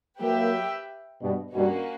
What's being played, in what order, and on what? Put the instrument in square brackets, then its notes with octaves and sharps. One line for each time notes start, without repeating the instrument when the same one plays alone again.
[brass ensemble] F#3 A#3 [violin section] G4 B4 E5 G5
[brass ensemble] G2 B2
[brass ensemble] G2 B2 [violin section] A#3 C#4 F#4